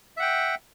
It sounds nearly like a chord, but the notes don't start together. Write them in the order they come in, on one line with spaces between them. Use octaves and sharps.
E5 F#5 G5